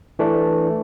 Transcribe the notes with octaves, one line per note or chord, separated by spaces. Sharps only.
E3 A3 D4